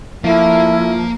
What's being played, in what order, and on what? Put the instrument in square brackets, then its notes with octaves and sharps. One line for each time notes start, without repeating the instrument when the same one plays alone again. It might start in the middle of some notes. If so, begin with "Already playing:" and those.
[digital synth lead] F3 [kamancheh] A3 [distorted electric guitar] A#3 [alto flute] E4